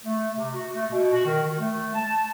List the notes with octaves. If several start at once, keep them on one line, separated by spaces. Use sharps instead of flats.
A3
C3
F#4
A3
B2
F#4
D#3
D#3
A3
A5